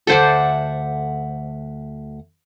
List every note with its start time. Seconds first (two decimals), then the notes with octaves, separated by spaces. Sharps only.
0.07 D2 A4 C5 D5 E5 F#5